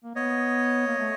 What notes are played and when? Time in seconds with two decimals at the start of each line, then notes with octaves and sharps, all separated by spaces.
0.04 A#3
0.15 B3 C#5 D#5
0.87 A#3
0.99 A3